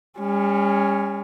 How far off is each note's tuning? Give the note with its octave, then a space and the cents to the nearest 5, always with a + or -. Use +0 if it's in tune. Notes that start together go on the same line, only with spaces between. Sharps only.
G3 +45 C#4 +0